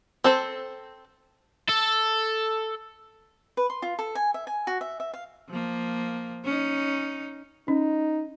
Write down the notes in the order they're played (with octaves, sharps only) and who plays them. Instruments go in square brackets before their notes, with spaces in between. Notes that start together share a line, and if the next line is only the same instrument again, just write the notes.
[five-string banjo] C4 A4 C5
[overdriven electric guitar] A4
[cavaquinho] B4
C6
F4
A4
G#5
E5
G#5
F#4
E5
E5
F5
[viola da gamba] F3 A#3
C#4 D#4
[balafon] C#4 [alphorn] D#4